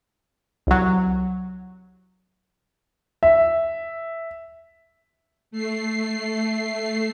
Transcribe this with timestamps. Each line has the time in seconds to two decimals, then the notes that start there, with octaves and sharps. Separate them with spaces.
0.67 C2 F#3
3.23 E5
5.51 A3 C7